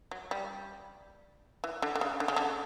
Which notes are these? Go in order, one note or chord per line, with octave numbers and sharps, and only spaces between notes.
F#3
G3
E3
D3
D3
C#3
D3
C#3
D3